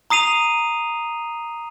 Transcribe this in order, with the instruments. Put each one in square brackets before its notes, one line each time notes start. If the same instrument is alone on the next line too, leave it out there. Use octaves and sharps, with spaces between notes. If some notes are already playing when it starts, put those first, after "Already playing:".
[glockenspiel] A#5 D#6 C7 D#7 F7